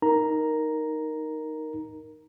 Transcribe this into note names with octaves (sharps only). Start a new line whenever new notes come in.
D#4 A#4 A#5